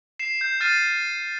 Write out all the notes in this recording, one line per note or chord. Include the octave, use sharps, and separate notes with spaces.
C7 E7
G6
F6 A6 C7 D#7